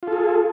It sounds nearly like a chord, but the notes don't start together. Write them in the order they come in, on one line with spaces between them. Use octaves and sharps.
F4 A4 G#4